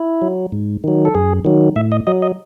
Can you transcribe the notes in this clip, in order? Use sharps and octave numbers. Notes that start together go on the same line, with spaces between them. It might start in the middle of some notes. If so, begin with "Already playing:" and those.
Already playing: E4
F#3
G#2
D#3 F#3
A4
F#2 G#4
D#3 F#3
A2 E5
D#5
F#3 D#5
D#5